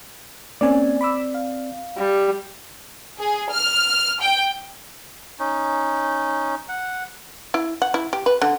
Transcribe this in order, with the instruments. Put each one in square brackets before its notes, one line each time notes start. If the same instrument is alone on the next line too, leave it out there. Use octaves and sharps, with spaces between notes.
[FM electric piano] A#3 C#4 G#5 [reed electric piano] C4 D5
[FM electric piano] B5 D6 E6
F5
[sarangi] G3
[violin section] G#4
F6
G5
[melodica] C#4 D#4
F#5
[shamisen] E4
F#5
E4
G4
B4
D3